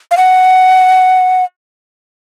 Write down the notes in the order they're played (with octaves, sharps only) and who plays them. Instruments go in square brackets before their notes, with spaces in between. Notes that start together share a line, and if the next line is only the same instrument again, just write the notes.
[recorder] F5
F#5